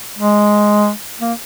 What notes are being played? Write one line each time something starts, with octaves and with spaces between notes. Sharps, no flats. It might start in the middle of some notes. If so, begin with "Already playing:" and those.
G#3
A#3